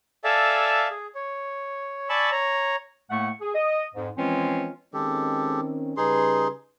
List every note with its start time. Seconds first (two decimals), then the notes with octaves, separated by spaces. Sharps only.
0.24 A4 D5 E5 F5 G#5 A5
0.91 G#4
1.15 C#5
2.09 D5 G#5 A5 B5 C#6 E6
2.32 C#5 A#5
3.10 A2 A3 A#3 F#5 C#6
3.41 G#4
3.55 D#5
3.94 F2 G#2
4.17 E3 F3 G#3 C4 C#4 F4
4.94 D#3 G#3 C4 C#4 G4 A4
5.97 C#3 G3 D#4 G#4 B4 C6